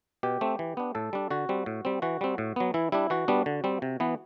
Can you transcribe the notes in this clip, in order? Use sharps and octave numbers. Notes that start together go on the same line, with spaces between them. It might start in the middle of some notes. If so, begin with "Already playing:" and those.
B2 G4
A3 C4
E3
B3 D4
A2 A4
G3 D4
D3 F#4
G3 C4
A2
G3 C4
E3 F#4
G3 C4
A2
F#3 B3
E3 E4
G3 D4 E4
E3 F#4
G3 B3 D4
D3
G3 C4
C3
E3 B3